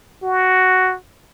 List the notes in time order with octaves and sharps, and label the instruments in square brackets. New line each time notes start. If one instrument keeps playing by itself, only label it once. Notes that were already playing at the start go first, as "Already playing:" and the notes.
[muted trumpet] F#4